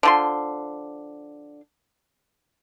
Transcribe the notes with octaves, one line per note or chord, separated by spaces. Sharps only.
D3 F3 C6